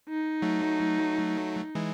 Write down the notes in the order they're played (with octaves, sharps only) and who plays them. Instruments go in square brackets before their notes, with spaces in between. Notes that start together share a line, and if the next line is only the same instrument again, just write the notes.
[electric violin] D#4
[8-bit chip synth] F#3 A3
E3 G#3